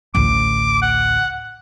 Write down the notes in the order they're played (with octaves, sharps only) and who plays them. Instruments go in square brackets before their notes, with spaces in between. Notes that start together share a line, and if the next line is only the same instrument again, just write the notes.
[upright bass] A1 D2 [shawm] D6
[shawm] F#5